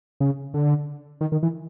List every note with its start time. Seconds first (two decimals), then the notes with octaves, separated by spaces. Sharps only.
0.20 C#3
0.54 D3
1.21 D#3
1.32 D#3
1.43 E3